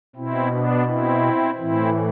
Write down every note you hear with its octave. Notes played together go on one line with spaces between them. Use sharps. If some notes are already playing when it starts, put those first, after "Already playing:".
B2 C4 E4
B3 D4
C4 E4
A2 E3 C4 E4